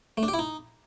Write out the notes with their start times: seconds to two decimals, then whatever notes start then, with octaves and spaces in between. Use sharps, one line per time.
0.17 A3
0.23 D4
0.28 G4
0.34 E4
0.39 D#4